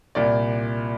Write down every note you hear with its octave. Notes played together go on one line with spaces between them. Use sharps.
C2 A#2 D5